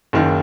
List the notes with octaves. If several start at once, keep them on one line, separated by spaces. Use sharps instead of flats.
F#1 F#2 D#3